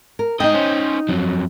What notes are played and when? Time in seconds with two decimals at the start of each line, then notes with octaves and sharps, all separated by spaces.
0.19 A#4
0.40 G#2 D#4 D#5 G5
0.55 C#4 C5
1.09 F2 F#3